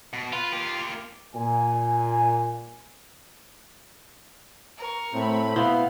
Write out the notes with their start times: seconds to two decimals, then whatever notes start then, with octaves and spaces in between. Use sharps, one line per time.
0.13 B2
0.33 F4 B4
0.53 A#3 G4
1.35 A#2 G#5
4.78 A#4 C#6
5.13 A2 A3 C4 B5
5.56 B2 B3 E4 C5 F5